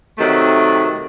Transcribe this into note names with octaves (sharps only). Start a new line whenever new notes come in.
C3 D#3 F#3 A3